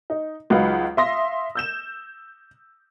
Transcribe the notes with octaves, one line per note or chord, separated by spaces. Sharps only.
D#4
C#2 F#3 D#4 B4 F5 F#5
E5 F5 C6 D#6 A#6
E6 G6 E7